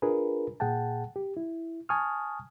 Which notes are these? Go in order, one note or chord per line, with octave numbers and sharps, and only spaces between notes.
D4 F4 G#4 A#4 B4
A#2 G#4 F#5 G5 A5
G4
E4
G#5 A5 C#6 D#6 F6